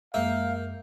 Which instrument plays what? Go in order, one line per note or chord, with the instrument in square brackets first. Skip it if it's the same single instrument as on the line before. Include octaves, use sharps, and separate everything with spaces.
[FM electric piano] F#2 G#3 G6 [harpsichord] A#3 [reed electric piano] E5 [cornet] F5